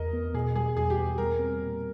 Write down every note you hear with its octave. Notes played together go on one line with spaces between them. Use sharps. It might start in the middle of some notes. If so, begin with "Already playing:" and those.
Already playing: E2 A#4 D#5
B3
B2 G#4
G3 G#4
E2 G#4
G4
B3
G3 A#4
C4
A#2